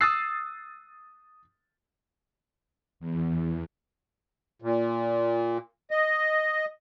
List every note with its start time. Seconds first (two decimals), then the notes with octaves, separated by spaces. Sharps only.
0.01 D#6 E6 F#6 A6 C7
3.00 E2
4.62 A#2
5.91 D#5